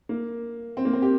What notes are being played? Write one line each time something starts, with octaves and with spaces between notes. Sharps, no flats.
A#3
C4
A#3
C4
G4